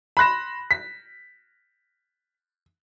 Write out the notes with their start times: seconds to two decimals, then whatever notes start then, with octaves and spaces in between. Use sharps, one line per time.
0.17 B5 C6 F#6 A#6 E7
0.71 B6